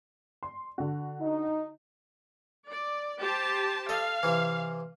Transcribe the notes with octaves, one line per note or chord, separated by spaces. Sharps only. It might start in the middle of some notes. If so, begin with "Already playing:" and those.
C6
D3 F#4
D#4
D5
G4 C5 A5
A4 D#5 F5
C3 E3